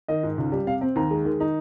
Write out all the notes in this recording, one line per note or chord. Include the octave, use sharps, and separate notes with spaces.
D#3 D#5
G#2
C#2
G3
C3 F5
C4
D#2 A#5
G#3
D#3
D#4